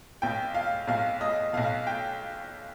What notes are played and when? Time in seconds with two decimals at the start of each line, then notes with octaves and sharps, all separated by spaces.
0.22 B1 B2 G5
0.54 F5
0.87 B1 B2 F5
1.21 D#5
1.53 B1 B2 F5
1.87 G5